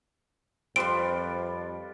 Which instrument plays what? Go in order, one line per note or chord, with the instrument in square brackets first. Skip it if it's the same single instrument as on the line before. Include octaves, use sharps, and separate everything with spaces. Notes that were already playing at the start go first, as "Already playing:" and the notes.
[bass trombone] F2 [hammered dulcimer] G3 F4 B4 [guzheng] C4 C6 [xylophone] D7